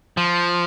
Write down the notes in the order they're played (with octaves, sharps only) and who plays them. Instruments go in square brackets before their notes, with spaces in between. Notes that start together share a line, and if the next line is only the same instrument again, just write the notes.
[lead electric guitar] F3